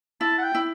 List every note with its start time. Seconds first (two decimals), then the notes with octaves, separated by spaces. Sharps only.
0.21 E4 A5
0.38 F#5
0.43 G5
0.55 E4